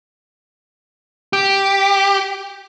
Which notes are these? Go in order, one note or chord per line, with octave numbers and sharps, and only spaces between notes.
G4